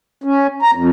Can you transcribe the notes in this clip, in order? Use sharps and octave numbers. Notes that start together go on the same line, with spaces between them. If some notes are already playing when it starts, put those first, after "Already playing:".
C#4
A#5
F2